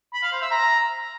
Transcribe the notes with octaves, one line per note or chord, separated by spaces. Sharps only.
B5
F5
C5
E5
A#5